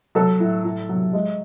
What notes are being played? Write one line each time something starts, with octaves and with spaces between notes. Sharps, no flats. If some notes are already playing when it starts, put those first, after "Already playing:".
F#3 A4
A2
A2
F#3
G#3